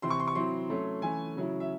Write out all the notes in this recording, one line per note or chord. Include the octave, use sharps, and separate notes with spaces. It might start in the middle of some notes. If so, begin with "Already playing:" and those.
C3 E3 C4 E4 C6
C#6
C6
C#6
F#3 C4 E4 C6
F#3 A3 C#4
E3 A3 C#4 G#5
C#3 F#3 C#4 E4
E5